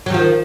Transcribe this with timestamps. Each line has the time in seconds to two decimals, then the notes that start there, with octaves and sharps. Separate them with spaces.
0.06 F#3
0.10 D#3
0.14 F3